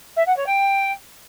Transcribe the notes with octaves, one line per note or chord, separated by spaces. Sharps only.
E5
F#5
C#5
G5